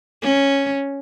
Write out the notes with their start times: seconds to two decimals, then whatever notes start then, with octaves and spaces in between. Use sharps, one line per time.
0.22 C#4